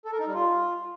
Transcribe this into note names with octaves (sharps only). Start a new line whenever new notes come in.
A4
A#4
D#4
G3
F4